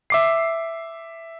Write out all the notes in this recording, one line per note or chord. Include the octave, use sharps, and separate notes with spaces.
E5 D6 C7